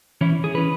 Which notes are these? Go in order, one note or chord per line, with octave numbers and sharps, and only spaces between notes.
E3 C#4 E4
G#4
E3 C#4 B4